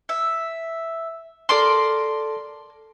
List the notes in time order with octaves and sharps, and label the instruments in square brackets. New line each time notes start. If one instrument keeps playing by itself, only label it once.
[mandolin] E5
[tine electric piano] A4 A5 [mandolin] A#4 D5 C6